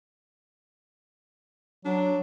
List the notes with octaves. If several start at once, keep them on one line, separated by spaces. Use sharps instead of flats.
F#3 D4